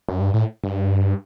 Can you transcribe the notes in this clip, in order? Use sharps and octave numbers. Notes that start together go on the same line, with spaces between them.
F#2
G2
A2
G2